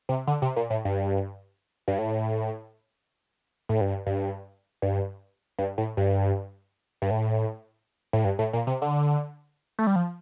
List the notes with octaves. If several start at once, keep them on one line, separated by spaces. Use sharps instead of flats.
C3
D3
C3
A#2
A2
G2
G2
A2
A2
G2
G2
G2
G2
A2
G2
G2
A2
A2
G2
A2
A#2
C3
D3
A3
G3
F3